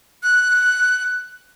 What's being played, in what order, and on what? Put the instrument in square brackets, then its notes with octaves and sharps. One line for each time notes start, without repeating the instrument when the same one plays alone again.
[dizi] F#6